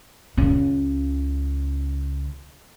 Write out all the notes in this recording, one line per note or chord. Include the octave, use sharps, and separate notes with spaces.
C#2 C#3